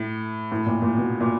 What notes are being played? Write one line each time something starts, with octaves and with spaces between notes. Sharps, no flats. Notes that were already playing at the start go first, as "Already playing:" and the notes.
Already playing: A2
A2
A#2
A#2
B2
A#2